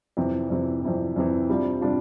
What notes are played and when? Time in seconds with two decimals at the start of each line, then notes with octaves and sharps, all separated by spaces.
0.17 F2 C3 E3
0.50 F2 C3 E3
0.82 F2 C3 E3
1.16 F2 C3 E3
1.49 C3 G3 D4 F4
1.81 C3 G3 D4 F4